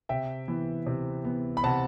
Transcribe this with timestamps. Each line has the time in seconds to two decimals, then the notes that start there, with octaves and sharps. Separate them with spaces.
0.09 C3 E5 G5
0.48 E3 B3
0.87 C3
1.24 E3 B3
1.57 B5
1.64 C3 F#5 A5